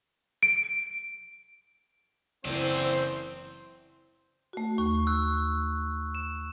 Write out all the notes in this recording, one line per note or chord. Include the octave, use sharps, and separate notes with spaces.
D7
F#1 E3 C4 C5 D5 E5
A3 F#4
D#2 C#6
E6 F#6
E7